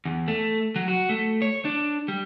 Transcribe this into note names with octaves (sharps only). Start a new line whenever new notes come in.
E2
A3
F#3
F#4
A3
C#5
D4
G3